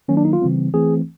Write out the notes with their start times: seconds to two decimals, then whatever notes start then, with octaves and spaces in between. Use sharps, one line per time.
0.08 D#3 F#3 A#3 C#4
0.17 D4
0.25 D#4
0.33 F4
0.42 C#3 E3 G3 C4
0.74 E3 A3 C4 G#4